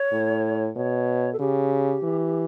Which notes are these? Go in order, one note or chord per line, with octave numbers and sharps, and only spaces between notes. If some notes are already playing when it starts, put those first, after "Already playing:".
Already playing: C#5
A2
B2 C#5
A4
C#3 G4
E3